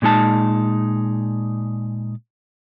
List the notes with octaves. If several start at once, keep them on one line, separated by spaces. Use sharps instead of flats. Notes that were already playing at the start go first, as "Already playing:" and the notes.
A#2 G#3 D#4 A5